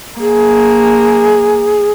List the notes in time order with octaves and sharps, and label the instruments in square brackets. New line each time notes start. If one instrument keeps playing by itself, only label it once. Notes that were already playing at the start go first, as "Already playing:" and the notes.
[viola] A#3 [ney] G#4